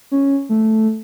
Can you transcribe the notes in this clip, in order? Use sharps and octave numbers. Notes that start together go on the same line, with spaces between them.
C#4
A3